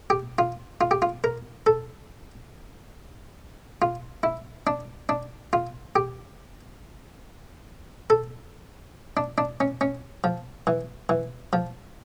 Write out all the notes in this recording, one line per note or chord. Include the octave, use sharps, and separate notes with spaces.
G4
F4
F4
G4
F4
A#4
A4
F4
E4
D4
D4
F4
G4
A4
D4
D4
C#4
C#4
F3
E3
E3
F3